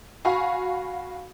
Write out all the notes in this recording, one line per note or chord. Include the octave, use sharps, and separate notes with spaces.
F#4 F5 G#5 B5 C#6